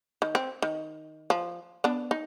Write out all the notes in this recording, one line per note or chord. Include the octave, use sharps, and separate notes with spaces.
D#3
C4
D#3
F3
B3 D4
D#4